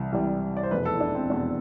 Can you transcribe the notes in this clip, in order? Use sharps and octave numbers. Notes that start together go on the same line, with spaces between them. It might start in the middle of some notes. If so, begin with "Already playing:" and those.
Already playing: C2 C3 E3
C2 C3 E3 G3
D5
C5
F1 E2 B2 B4
A4
E4
D4
C4
F1 E2 B2 D4